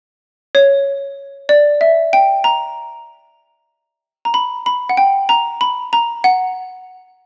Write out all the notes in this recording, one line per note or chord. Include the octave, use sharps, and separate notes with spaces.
C#5
D5
E5
G5
A#5
A#5
B5
B5
F#5
G5
A#5
B5
A#5
F#5